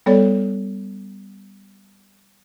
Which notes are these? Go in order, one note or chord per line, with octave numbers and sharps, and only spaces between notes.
G3 B3 A4 C#5 D5